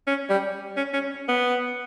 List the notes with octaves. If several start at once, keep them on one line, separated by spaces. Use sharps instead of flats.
C#4
G3
C#4
C#4
B3